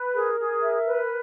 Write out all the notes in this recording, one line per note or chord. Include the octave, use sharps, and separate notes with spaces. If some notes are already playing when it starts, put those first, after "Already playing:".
Already playing: B4
G#4 A#4
G#4
E5
B4